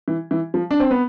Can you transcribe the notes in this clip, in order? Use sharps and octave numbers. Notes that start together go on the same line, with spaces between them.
E3
E3
F3
D4
C4
B3